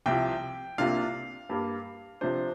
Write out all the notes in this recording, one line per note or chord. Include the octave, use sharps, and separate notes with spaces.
C2 C3 F3 G5
C2 C3 A#3 D4 F4 F5
G2 G3 A#3
C3 F3 D4 C5